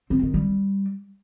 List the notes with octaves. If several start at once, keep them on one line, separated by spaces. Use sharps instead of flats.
C4
D#3
G3